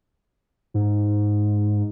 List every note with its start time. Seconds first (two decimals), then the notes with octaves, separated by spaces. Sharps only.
0.74 G#2